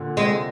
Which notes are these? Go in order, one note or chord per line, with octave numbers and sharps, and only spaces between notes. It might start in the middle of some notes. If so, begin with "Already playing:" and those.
Already playing: A#2 D3
C3 G#3